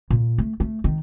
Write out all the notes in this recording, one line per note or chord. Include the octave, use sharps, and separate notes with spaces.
A#2
A3
A3
D#3